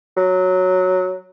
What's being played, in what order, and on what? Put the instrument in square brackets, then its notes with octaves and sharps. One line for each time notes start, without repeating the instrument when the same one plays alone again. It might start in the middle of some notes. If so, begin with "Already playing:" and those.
[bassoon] F#3